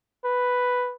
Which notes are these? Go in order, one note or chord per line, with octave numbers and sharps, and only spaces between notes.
B4